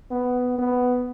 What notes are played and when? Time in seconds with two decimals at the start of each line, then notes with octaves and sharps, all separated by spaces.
0.11 B3
0.58 B3